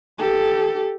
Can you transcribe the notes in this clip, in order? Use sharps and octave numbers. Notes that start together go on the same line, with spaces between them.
G4 A4